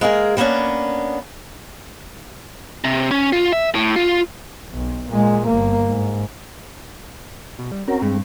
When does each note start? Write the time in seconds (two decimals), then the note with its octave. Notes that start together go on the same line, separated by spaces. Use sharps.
0.01 G#3 A#3 G#4 A#4
0.37 G3 A#3 B3 C#4 D4
2.84 C3
3.11 C#4
3.33 F4
3.53 E5
3.75 A2
3.96 F4
4.71 B1
5.11 A#2 G#3
5.47 G1 A#3
5.87 G#2
7.59 B2
7.72 G3
7.88 C4 C#4 F#4 A#4
8.02 G2 G#3